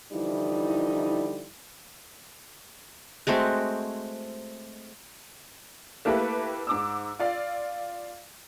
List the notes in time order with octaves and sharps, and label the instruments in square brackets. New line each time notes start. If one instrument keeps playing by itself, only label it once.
[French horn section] D3 E3 F3 G3 D#4 E4
[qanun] G#3 A3 C4 F#4
[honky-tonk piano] A3 A#3 E4 G4 A4 B4
G#2 D6 E6
F4 D5 F5